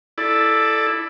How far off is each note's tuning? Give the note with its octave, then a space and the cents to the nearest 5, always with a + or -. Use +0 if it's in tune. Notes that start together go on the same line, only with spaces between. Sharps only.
E4 +0 A4 -5 D5 +15